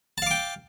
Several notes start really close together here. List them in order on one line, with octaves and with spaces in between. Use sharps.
A5 F5 D6 G5